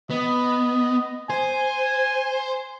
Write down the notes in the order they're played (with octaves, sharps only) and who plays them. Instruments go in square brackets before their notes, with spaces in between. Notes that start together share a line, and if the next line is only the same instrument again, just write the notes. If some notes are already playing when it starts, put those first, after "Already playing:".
[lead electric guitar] B3 [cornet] D#5
[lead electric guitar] C5 [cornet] G#5